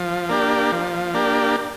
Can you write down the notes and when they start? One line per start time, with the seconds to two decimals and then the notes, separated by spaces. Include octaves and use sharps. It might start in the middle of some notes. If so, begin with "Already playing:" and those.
Already playing: F3
0.29 A#3 D4 G4
0.72 F3
1.14 A#3 D4 G4